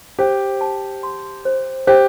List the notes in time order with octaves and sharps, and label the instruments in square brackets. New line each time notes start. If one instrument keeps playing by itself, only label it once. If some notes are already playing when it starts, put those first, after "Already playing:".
[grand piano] G4 [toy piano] C5
[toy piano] A5
C6
C5
[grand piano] G4 [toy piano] C5